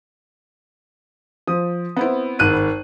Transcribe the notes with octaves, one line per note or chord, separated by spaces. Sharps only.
F3 D#6
B3 C4 E4
G#1 F#6 D#7